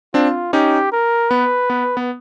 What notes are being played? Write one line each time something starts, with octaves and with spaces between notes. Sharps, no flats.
C4 D4 F4
C#4 D#4 G4
A#4
B3 B4
B3
B3